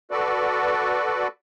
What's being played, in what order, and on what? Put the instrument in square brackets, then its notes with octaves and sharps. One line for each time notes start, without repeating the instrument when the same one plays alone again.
[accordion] F#4 A4 B4 D5